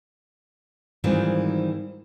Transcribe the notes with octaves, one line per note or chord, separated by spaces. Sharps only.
G#2 D#3 E3 G3 C4 F4